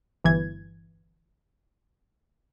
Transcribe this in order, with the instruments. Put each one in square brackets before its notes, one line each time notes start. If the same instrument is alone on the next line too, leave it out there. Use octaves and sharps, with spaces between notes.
[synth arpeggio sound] G1 E3 G#6